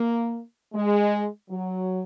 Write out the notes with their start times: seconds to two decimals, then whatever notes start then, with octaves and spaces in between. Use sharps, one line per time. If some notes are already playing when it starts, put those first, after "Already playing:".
Already playing: A#3
0.74 G#3
1.50 F#3